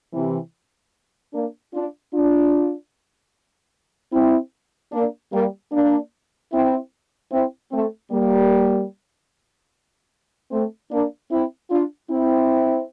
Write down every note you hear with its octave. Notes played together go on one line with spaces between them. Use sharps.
C3 E3
A#3 D4
D4 F4
D4 F4
C4 E4
A#3 D4
G3 A#3
A#3 D4
C4 E4
C4 E4
A3 C4
G3 A#3
A3 C4
A#3 D4
C4 E4
D4 F4
C4 E4